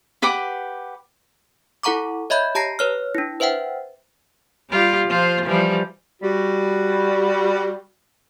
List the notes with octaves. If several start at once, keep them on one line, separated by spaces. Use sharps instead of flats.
G4 B4 F#5 D6
E4 A4 F#5 A#5 C#6 D6
C#5 D#5 E5 B5 G6
G4 A5 A#5 A#6 C7
B4 C#5 F6
D4 E4
B4 C5 E5 F#5 G5
G3 F4 G4
F3 F4 C5
E3 F3 G3
G3 F#4